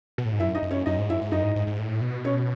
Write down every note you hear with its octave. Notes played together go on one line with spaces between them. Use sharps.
B2
A2
G#2
F#2 E4 E5
D#4 D#5
F#2
C#4 C#5
F#2 D#4 D#5
G#2
F#2 E4 E5
G#2
F#2 D#4 D#5
G#2
G#2
G#2
A2
B2
C#4 C#5